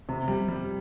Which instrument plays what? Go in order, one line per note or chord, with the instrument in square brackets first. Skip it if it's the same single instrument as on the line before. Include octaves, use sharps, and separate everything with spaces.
[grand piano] C3
G3
G3